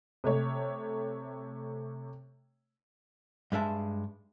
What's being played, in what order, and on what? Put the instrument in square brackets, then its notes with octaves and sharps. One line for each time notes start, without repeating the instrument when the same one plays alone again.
[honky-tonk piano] C3 A3 C#5
[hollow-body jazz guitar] G2 G#3 E5 A5